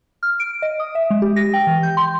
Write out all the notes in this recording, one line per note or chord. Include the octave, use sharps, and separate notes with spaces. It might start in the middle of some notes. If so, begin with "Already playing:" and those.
F6
D7
D#5
D#6
E5
G#3
G4
A#6
G5
E3
G6
C6